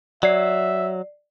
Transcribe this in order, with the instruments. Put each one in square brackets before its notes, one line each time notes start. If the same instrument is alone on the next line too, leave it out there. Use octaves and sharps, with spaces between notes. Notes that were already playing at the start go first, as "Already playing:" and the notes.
[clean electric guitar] F#3 [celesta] D5 C7 [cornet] E5